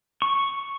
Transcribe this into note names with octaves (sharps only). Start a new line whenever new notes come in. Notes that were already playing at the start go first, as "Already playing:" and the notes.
C#6